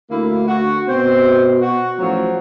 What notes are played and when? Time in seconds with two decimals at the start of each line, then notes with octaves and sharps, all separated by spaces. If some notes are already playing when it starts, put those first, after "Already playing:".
0.11 D2 A#3 E4
0.47 F#4
0.89 B2 C4 C5
1.61 F#4
1.98 A1 F3 F#3